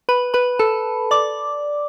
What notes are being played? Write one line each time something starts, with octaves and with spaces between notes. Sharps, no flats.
B4 B5
B4 B5
A4 A5
D5 D6